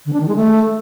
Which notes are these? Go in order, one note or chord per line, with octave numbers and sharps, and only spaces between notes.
D3
D4
D#3
G#3
A3